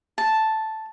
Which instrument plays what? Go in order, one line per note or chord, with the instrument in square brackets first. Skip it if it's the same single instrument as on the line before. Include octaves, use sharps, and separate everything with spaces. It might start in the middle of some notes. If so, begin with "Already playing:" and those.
[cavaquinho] A5